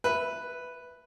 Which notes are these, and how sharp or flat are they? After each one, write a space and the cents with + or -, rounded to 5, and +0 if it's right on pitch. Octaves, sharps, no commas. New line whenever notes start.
B4 +0 E5 +0